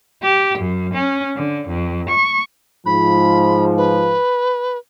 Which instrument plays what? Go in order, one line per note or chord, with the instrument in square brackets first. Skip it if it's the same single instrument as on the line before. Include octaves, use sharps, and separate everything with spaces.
[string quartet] G4
F#2
C#4
D3
F2
C#6
[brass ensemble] G#2 F3 [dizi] B5
[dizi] B4